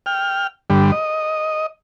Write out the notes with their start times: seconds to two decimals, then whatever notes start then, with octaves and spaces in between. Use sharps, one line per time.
0.06 G5 F6
0.70 G2 D3 G3
0.92 D#5